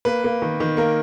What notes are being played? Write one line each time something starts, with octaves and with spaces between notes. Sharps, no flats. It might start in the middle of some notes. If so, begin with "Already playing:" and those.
A#3 B4
A#3
D#3
D#3
A#3 A#4